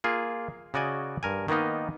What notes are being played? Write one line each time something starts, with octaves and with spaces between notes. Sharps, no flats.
A#3 F4 G#4
C#3 F#4 D5 D#5 G#5
G2 A#4 G#5
D#3 A#3 B3 D#4 D#5